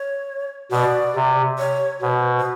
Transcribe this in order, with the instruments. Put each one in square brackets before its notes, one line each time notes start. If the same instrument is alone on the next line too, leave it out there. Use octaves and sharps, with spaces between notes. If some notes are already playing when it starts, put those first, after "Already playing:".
Already playing: [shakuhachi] C#5
[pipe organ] B2 [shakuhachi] D5
[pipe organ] C3
[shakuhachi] C#5
[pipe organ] B2 [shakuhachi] C5
[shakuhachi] C5